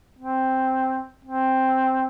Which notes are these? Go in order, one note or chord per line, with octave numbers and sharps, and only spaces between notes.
C4
C4